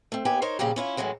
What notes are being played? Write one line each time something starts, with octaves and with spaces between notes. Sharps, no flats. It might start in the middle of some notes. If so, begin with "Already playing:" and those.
A3 C4
D#2 B3 G4 G#5
D#4 A#4 C5 C#5
A#2 C#3 F3 G3 G4
C#4 E4 F4
F#2 A2 E3 F#3 G#3